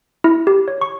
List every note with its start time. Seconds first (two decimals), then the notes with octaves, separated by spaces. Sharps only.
0.24 E4
0.47 G4
0.68 C#5
0.81 C#6